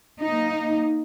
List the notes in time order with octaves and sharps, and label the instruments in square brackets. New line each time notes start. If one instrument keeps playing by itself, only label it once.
[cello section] A#3 D#4